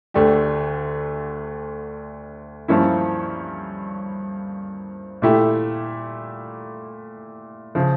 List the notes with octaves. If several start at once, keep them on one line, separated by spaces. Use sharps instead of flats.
D2 D3 A3 D4 G4
G2 F3 A#3 C#4 E4
A#2 A3 E4 G4
C#3 F3